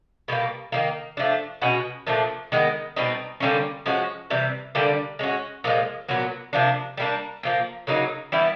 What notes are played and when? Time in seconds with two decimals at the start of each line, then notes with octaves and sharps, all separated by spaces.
0.28 B2 G3 A#3
0.72 D#3 F#3 A#3
1.17 F3 A3 D4
1.62 B2 G#3 C#4 F#4
2.07 A#2 F3 A3 D4
2.52 D#3 G#3 B3
2.96 B2 G3 C4 D#4
3.40 D3 G3 A#3 C#4
3.86 F3 G#3 C#4 F#4
4.30 C3 E3 G3
4.75 D3 G3 A#3 D4
5.19 G#3 C#4 F#4
5.64 A#2 F3 G#3
6.09 A#2 F#3 B3
6.53 C3 F3 A#3 D4
6.98 G3 A#3 D4
7.43 A#2 F3 A#3
7.87 C#3 F#3 A#3 D#4
8.32 E3 G3 B3 E4